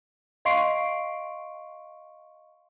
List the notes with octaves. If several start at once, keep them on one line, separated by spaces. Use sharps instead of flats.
D#5 F5 C6 C#6 C7 D7